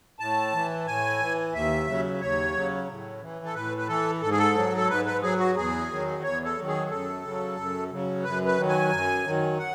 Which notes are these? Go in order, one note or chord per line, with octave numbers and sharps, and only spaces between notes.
A2 A5
E3
A2 G#5
E3
D#2 E5
C#3 F#3
D#2 C#5
C#3 F#3
A2
E3
A4
A2 B4
B4
E3 A4
G#2 A4
G#4
A4
F#3
A4
G#2 B4
B4
F#3 G#4
F#4
E2 G#4
D#3 F#3
E2 C#5
A4
D#3 F#3
G#4
F#2 A4
C#3 F#3
F#2
C#3 F#3
F#2 B4
B4
D#3 F#3
G#5
F#2
D#3 F#3
F#5